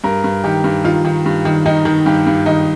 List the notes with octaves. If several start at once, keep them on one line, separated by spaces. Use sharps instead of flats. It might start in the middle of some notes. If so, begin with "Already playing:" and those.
G2 A#4
G2
D#3 G4
G2
D#3 F4
D#3
G2
D#3
D#3 D#4
D#3
G2 G4
G2
D#3 D#4